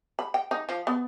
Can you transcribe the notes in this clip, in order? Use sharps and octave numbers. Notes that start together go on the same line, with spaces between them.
B5
G5
D#4
F3
B3